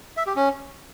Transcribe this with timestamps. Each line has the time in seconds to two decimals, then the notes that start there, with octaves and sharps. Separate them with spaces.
0.17 E5
0.27 G4
0.36 C#4